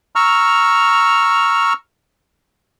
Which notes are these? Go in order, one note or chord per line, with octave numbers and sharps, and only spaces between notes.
A#5 C#6 E6 F6